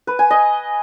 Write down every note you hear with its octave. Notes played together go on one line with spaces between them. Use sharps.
B4
G#5
D#5